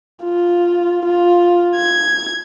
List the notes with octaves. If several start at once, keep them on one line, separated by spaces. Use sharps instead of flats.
F4
F4
G#6